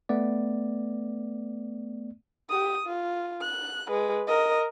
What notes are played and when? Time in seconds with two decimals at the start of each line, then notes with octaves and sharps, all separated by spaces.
0.09 A3 B3 D5
2.50 G4 D#6
2.87 F4
3.42 F#6
3.87 G#3 B4
4.27 A#4 D#5